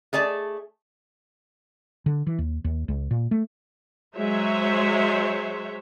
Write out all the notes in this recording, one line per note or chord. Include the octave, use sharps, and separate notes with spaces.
A3 G#4 D5 A5
D3
E3
D#2
D#2
C#2
A#2
A3
F#3 G#3 C5 C#5 E5